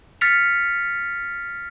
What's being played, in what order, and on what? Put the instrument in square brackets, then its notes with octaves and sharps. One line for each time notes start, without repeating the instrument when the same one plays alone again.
[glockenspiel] F6 A6 B6 C#7 F7